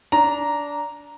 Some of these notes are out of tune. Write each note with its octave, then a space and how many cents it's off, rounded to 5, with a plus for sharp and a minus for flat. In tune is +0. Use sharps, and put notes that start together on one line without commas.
D4 -20 A#5 +0